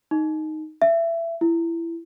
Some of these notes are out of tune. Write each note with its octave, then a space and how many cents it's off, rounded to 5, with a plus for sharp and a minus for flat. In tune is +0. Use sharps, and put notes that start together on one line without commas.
D#4 +0
E5 +20
E4 +20